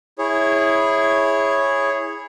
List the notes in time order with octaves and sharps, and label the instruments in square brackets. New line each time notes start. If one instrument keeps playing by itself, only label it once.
[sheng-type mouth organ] E4 G#4 C#5